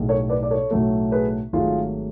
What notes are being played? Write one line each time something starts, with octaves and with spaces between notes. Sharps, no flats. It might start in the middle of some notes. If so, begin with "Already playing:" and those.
Already playing: B1 A2 G#3
A4 C#5
B4 D5
D5
A4 C#5
B1 A2 F#3 A3
G#4 B4
G#1 G#2 F#3 A3 F4 G#4